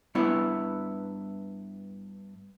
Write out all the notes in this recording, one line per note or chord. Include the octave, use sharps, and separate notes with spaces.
G2 B3 E4 B4 C#5